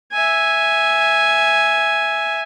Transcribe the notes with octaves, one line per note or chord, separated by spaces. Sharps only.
E5 G#5